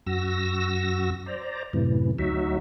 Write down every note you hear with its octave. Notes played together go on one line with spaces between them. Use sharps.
F#2 F#4 E6 A#6
C5 D5 A#5
F#2 A2 C3 E3
D2 F#3 D#4 F#4 E5